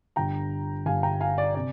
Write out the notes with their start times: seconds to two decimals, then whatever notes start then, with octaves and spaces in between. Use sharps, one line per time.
0.16 G1 G2 D3 G3 G5 A#5
0.86 G1 G2 D3 G3 F5 G#5
1.03 G5 A#5
1.21 F5 G#5
1.38 D5
1.55 C3 D5